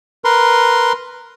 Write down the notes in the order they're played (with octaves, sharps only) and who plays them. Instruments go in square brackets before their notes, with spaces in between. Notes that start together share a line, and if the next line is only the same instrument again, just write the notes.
[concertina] A#4 B4 C6